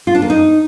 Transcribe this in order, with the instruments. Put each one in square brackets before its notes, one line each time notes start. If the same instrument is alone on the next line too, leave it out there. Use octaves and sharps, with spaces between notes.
[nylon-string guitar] F4
D4
A#3
D#4